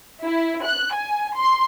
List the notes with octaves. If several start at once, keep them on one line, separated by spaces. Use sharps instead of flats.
E4
F#6
G#5
C6